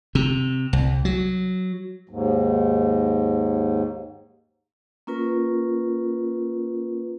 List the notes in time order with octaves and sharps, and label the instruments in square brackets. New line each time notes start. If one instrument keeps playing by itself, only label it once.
[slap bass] C3
C2
F#3
[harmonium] D#2 G#2
[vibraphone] A#3 C#4 F4 A#4 B4